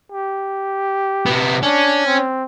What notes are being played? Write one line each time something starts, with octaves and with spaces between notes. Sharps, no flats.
G4
C3 B3
C#4 D4
C4